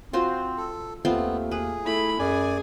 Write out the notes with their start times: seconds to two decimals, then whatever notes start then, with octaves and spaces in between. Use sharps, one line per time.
0.13 C4 F4 F#4 C5
0.58 A4
1.05 D#2 A3 B3 C4 F4
1.51 G#4 B4
1.84 A3 E4 B5
2.19 F#2 G#4 D5 G#5